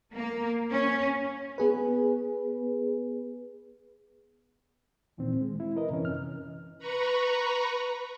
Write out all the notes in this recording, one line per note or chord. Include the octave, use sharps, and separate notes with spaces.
A#3
C#4
B3 G#4 B4
D2 A#2 D#3 E3 C4
G#3
E4
A#4 B4 D#5
F#2 C3 E3 C#4
F6
B4 A#5 B5 C#6